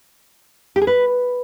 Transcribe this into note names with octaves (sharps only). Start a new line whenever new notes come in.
G4
G#4
B4